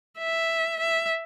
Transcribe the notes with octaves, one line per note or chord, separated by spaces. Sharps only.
E5
E5